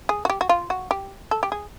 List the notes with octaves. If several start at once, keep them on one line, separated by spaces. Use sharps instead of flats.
G#4
F#4
G4
F#4
F4
F#4
G4
A4
G4
G#4